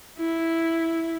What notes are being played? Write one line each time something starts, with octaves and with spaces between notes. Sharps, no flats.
E4